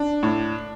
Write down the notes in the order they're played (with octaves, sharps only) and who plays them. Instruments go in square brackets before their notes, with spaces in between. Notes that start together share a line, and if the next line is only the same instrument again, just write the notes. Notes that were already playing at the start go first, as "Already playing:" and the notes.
Already playing: [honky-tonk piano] D4
A2